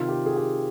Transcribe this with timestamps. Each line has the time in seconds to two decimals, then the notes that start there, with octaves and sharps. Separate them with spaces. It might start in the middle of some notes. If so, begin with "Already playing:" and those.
Already playing: C3 D#3 F4
0.09 G4
0.26 G#4
0.36 G4